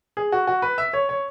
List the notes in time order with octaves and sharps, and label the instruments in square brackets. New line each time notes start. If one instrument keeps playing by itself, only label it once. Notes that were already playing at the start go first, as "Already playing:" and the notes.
[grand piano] G#4
F#4
F#4
B4
E5
C#5
C#5